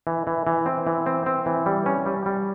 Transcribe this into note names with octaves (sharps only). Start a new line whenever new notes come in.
E3
E3
E3
C4
E3
C4
C4
E3
G3
C#4
G3
G3